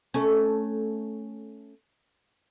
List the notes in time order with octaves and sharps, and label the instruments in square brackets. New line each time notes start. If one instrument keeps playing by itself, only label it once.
[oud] A3 C#4